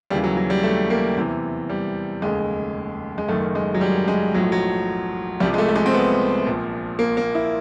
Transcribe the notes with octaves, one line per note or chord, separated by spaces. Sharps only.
D#2 C#3 E3 G3
F#3
F#3
G3
A3
A#3
E2 C3 E3
G3
F1 D#2 C#3 G#3
G#3
F#1 F#2 D#3 A3
G#3
F#3
G3
G#3
B1 A2 F3 F#3
F#3
C2 C3 F3 G3
G#3
A3
A3
G#3
C4
B3
A#1 A#2 F3
A#3
A#3
E4